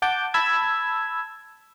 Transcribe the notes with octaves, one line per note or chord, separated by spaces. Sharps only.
F#5 A5 D6 G6
A5 B5 E6 G#6